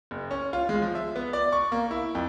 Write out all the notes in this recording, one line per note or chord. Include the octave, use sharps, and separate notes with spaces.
F#1
C#4
F4
G#3
F3
E5
B3
D5
C#6
A#3
E4
F2